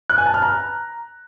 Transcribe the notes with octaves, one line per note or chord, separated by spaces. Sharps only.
F#6
G#5
A5
F6
A#5